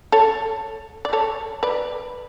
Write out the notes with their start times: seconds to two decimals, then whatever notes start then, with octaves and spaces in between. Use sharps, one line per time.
0.12 A4 C#5
1.05 D5
1.13 A4 C#5
1.63 B4 D5